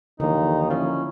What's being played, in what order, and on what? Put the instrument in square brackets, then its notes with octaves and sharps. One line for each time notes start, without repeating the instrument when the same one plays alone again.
[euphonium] D#2 [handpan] D3 [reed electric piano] E3 F3 A#3 [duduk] D#4
[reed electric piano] F3 A#3 F4 [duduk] C#4 [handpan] E4